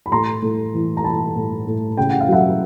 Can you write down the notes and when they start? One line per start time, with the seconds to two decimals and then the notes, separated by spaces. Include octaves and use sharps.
0.06 B5
0.12 A2 A#5 C6
0.42 A2
0.74 E3
0.97 A#5
1.04 E3 A5 B5
1.36 A2
1.67 A2
1.97 C#3 G5
2.10 F#5
2.21 F5
2.28 F#3 E5 F#5